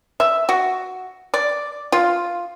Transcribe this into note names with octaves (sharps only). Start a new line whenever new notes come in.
E5
F#4
D5
F4